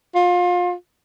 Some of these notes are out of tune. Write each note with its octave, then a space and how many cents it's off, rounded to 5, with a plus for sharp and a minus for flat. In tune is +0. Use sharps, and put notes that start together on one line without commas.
F4 +30